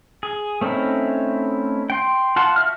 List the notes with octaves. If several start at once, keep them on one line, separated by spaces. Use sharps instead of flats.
G#4
A3 C4 C#4 D#4 E4
G5 C6
F4 F#5 A5 C6
F#4 E5 F6